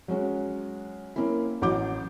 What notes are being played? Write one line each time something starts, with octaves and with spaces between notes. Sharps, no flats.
F#3 G#3 C#4 F#4
A#3 C4 C#4 E4
A1 F#3 F#4 D6 G6